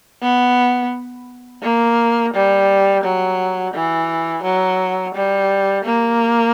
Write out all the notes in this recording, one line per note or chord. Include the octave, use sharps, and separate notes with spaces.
B3
A#3
G3
F#3
E3
F#3
G3
A#3